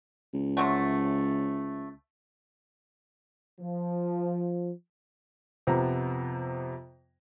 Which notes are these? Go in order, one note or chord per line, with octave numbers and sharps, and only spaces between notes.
C#2
C3 F#3 A3
F3
F2 C3 B3 A#5